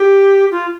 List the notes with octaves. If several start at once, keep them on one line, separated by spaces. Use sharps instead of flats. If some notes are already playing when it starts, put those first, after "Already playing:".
Already playing: G4
F4